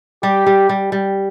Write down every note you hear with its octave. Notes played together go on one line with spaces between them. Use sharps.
G3 G4
G3
G3
G3